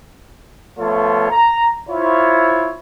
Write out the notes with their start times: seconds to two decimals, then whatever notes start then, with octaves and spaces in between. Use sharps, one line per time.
0.79 F3 A3 B3 F4 A4 C#5
1.31 A#5
1.89 E4 F4 C5 C#5